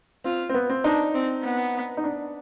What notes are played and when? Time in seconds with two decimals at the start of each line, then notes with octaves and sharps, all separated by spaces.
0.24 C4 F4
0.49 C4
0.54 B3
0.70 C4
0.84 D4 D#4
1.15 C4
1.44 B3
1.97 D#4
2.04 D4